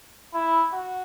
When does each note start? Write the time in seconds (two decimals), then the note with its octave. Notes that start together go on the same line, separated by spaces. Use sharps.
0.34 E4
0.74 F#4